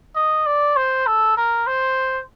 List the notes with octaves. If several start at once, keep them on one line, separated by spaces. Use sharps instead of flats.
D#5
D5
C5
A4
A#4
C5